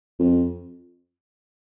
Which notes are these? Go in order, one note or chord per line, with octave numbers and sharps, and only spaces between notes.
F2